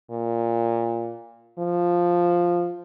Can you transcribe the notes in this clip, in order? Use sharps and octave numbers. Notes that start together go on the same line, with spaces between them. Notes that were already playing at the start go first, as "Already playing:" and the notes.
A#2
F3